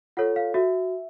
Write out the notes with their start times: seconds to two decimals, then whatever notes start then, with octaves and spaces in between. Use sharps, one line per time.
0.17 F4 A4 C#5 F#5
0.36 F5
0.54 F#4 E5